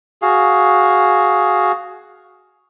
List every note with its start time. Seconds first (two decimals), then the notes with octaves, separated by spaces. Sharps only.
0.22 F#4 G#4 F5